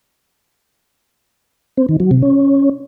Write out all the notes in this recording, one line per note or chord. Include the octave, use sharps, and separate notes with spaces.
C4
D#3
F#3
C3
C#4